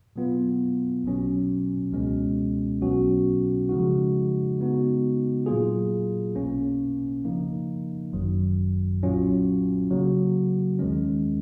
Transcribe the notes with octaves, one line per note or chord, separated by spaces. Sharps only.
B2 F#3 B3 F4
B1 B2 F#3 C#4
C#2 B2 G#3 C#4
B1 B2 F#3 C#4 F#4
C#3 F3 G#3 D#4 F#4
C#3 G#3 B3 D#4 F#4
A#2 F#3 A#3 F4 G#4
B1 B2 A#3 C#4
C#3 F3 A#3 D#4
G#1 F#2 D#3 F#3
B1 A#2 F#3 C#4 F4
C#3 F#3 A#3
D#2 D#3 G#3 C#4